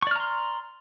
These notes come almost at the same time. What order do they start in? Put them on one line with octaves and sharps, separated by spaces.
C#6 D5 F6 A#5 C6